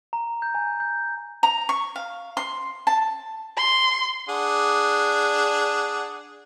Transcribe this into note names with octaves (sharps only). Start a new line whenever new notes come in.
A#5
G6
G#5
G6
A#5
C#6
F5
C6
A5
C6
D4 G#4 F#5